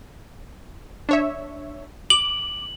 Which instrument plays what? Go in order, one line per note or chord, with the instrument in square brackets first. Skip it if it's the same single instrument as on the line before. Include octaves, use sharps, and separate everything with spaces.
[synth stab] D4 C#5 E5
[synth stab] D6 [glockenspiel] F#7